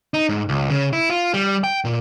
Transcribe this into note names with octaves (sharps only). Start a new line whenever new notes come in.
D#4
G#2
C#2
C#3
E4
F4
G3
G5
A#2